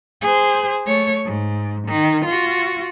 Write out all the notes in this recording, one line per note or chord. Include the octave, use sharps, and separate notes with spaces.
G#4 C5
A3 C#5
G#2
D#3
F4 F#4